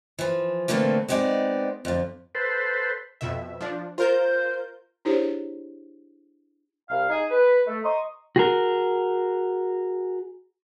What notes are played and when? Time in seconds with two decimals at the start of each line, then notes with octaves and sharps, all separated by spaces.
0.19 E3 F3
0.68 A#2 D3 E3 A3 A#3 C4
1.08 G#3 B3 C4 D#4 D5
1.85 F2 D3
2.35 A4 B4 C5
3.21 F2 B2 E5
3.61 F3 D4
3.98 F4 A#4 C5 G6
5.05 D4 E4 G4 G#4 C5 C#5
6.90 C2 F5
7.09 D#4 G#4
7.31 B4
7.67 A3
7.84 D#5 A#5 C6 C#6 D#6
8.36 F#4 G#4 A#4